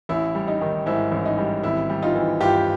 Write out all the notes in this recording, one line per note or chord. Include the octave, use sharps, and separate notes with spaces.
A1 E4
G3
D#4
D#3
G#2 E4
A1
D#4
G3
G#1 E4
G3
D#4 F4
E3
G2 F4 G4